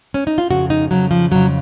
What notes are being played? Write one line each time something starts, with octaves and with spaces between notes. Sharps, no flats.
C#4
D#4
F4
F2 C#3 F#4
D#4
F2 C#3 F#3
F3
F2 C#3 F#3